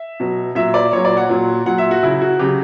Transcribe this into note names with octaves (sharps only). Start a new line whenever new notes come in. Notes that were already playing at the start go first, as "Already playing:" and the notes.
Already playing: E5
B2 F#3
A#2 F#3 E5
D5
A#2 F#3 C#5
D5
F#5
A#2 F#3
A#2 F#3 F#5
E5
F#4
C#3 F#3 E4
F#4
C#3 F#3 G4